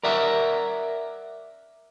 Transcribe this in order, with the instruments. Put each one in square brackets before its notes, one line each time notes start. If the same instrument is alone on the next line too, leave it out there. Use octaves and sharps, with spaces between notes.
[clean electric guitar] A#4 D5 E5 F#5 A#5